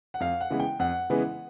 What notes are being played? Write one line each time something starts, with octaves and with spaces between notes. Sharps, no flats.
F#5
F2 F5
F#5
C#3 E3 G#3 B3
G5
F2 F#5
C#3 E3 G#3 B3